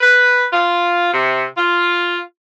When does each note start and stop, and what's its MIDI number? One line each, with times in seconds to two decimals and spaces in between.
0.01 0.45 71
0.52 1.10 65
1.11 1.43 48
1.57 2.19 65